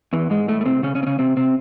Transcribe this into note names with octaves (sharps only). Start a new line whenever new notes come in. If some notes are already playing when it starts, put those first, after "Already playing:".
E2 E3
G#2 G#3
A2 A3
A3
C3 C4
C#3 C#4
C#3 C#4
C4
C#3 C#4
C3 C4
C3 C4